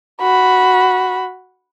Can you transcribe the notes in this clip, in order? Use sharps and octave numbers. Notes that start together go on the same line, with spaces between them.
F#4 B5